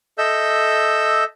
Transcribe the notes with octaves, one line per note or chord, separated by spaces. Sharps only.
A4 D#5 E5 E6 G6